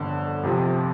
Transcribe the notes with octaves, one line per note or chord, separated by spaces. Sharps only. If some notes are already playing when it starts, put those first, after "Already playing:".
Already playing: G1 F2 D3
F2 C3 F3